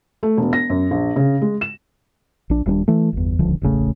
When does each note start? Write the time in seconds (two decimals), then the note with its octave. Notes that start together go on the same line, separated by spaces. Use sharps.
0.23 A3
0.37 E1
0.53 A#6
0.70 F#2
0.91 A#1
1.16 C#3
1.42 G#3
1.61 E7
2.50 A#1 D4
2.66 D#1 G3 C#4 D4
2.88 E3 A3
3.13 G1 E2
3.39 D#1 C#2 D3 F3
3.62 E1 A1 C#3 A3